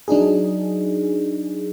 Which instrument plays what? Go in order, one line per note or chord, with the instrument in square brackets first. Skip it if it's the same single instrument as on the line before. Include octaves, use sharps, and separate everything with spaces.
[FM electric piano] F#3 D4 D#4 G#4